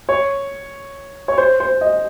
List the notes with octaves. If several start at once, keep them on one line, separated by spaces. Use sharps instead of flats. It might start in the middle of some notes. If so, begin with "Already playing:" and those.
C#5
C#5
C5
C5
D#5